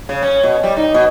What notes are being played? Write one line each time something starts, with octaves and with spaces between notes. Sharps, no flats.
C#3
C#4
B2
G3
D#4
B2